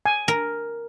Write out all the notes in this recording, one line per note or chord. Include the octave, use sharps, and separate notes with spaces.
G#5
A#4